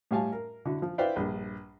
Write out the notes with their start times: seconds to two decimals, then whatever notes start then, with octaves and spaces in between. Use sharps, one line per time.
0.11 A2 G3 F5 G#5 A5
0.32 A#4
0.65 D3 E4 F#4
0.82 F3
0.98 E4 B4 C5 D5 F5 G5
1.16 A#1 G2